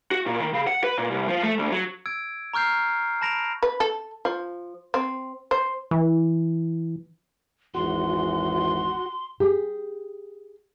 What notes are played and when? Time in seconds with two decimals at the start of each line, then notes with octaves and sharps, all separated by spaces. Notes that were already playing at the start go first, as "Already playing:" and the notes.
0.11 F#4
0.26 A#2
0.41 D#3
0.53 C#3
0.67 F#5
0.84 B4
0.98 A#2
1.10 C2
1.27 F3
1.43 A3
1.59 D2
1.72 F#3
2.06 E6 G#6 D7
2.54 A#5 C#6 F6 G6 C7
3.21 A5 B5 A#6 D7 F7
3.63 B4
3.80 A4
4.25 F3
4.94 C4
5.51 C5
5.91 E3
7.75 G#1 E2 F#4 C6
9.40 G4 G#4